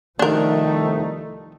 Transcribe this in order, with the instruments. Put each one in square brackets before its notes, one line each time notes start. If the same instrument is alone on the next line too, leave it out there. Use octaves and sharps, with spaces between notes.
[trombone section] C2 A3 [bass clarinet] D#3 [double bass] F3 D#4 [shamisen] D4 A#4